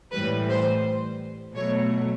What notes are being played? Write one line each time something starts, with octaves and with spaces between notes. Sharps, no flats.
A2 E3 G3 B4
C5
B2 F#3 A3 C#5